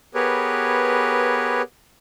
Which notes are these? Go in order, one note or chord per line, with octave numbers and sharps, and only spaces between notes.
B3 G4 G#4 A#4 B4 C#5